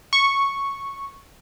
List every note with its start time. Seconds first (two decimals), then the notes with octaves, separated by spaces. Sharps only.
0.13 C#6